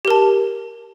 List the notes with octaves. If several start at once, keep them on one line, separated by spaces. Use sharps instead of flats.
G4 A#4 A5